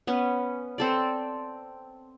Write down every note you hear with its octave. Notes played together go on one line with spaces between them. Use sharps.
B3 C#4
C4 A4 D5